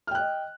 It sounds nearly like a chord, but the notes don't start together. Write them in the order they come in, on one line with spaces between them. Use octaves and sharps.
F6 G5 F#6 D#5